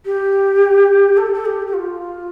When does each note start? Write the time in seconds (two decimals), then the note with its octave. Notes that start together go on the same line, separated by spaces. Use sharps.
0.05 G4
1.17 A4
1.34 A4
1.45 G4
1.66 G4
1.73 F4